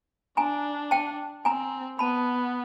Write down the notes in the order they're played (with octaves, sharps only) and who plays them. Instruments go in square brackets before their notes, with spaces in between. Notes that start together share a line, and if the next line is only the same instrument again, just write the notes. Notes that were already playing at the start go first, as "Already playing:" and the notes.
[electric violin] D4 [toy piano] G#5 A#5
[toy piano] G5 A5
[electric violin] C4 [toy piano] G#5 A#5
[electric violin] B3 [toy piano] A5 B5